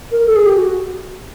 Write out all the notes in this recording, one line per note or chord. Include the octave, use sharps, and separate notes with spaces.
A#4
A4
G#4
G4
F#4